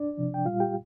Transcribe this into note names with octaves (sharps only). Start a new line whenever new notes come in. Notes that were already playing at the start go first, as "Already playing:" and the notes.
Already playing: D4 D5
C3 F3
G5
A#2 G3 F4 F5
G4 G5